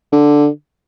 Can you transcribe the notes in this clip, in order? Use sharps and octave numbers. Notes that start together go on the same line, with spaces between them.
D3